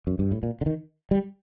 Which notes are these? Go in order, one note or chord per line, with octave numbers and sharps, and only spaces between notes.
F#2
G2
A2
A#2
D3
D#3
G3